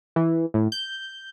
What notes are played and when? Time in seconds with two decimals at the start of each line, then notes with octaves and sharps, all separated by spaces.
0.16 E3
0.54 A2
0.72 G6